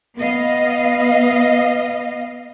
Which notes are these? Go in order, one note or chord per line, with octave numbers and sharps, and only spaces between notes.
B3 D#5 F5